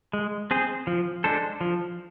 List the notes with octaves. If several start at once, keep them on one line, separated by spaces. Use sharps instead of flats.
G#3
C4 G#4 C5
F3
G#3 D4 A4 C5
F3